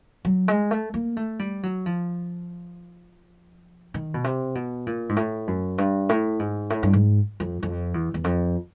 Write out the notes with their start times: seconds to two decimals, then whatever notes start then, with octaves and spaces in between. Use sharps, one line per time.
0.25 F#3
0.48 G#3
0.71 A3
0.94 A#3
1.17 A3
1.39 G3
1.63 F#3
1.86 F3
3.94 D#3
4.14 B2
4.24 C3
4.55 B2
4.87 A#2
5.09 G#2
5.16 A2
5.47 F#2
5.78 G2
6.09 A2
6.39 G#2
6.70 A2
6.83 G2
6.93 G#2
7.40 F2
7.63 F2
7.94 E2
8.14 E2
8.24 F2